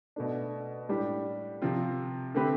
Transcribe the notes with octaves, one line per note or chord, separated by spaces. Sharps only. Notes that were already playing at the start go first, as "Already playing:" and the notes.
B2 A3 D4
A2 G3 D4 G4
C3 F3 C4 F4
D3 A3 C4 G4 B4